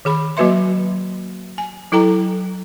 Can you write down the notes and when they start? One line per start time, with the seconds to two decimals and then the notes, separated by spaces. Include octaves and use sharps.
0.05 D#3 G#4 B5
0.37 F#3 A#3 F#4 B4 E5 C6
1.58 G#5
1.92 F#3 E4 A4 G5 A#5